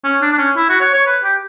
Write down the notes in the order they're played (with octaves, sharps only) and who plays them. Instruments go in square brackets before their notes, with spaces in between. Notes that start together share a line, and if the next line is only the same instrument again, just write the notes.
[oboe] C#4
D4
D4
C#4
E4
F#4
C#5
C#5
B4
G4